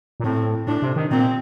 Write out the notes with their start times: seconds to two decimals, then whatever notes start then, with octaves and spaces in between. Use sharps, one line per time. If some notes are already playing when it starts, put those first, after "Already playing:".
0.20 A#2
0.24 A2 C4
0.67 A2 D4
0.82 C3
0.96 D#3
1.11 A#2 C4